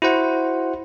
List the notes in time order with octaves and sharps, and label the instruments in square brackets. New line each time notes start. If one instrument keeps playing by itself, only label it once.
[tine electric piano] E4 F#4 C5 F#5